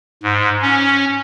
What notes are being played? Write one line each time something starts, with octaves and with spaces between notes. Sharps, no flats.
G#2
C#4